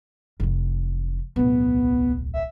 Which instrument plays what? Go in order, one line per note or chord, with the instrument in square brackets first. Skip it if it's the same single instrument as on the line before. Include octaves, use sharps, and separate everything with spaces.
[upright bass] F1 E3
[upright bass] D1 B1 [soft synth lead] B3
[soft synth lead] E5